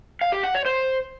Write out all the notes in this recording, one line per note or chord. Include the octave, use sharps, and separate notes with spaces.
F5
G4
F#5
C#5
C5